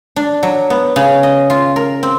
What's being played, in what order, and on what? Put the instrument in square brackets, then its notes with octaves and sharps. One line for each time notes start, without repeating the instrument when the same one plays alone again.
[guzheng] D4
F#3
B3
C#3
D#5
F4
A#4
C4